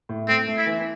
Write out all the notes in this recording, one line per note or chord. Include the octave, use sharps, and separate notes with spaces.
A2
A3 C4
A3
E4
E3